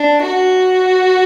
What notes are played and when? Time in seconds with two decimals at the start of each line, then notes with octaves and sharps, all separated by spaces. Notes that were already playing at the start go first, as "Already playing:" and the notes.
Already playing: D4
0.23 F#4